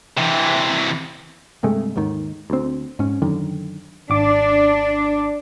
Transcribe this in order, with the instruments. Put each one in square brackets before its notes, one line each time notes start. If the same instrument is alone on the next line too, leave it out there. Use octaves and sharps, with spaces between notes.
[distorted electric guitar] C3 E3
[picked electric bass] G2 C3 G#3 A3
D#2 G#2 D#3
D2 C4
G#2 C#4
F#2 D3 D#3
[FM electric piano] G#1 D6 [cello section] D4